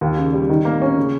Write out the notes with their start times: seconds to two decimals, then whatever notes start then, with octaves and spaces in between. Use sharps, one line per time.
0.01 D#2
0.17 C#3
0.33 G3
0.49 D#3
0.65 A#3
0.82 C#4
0.97 C#3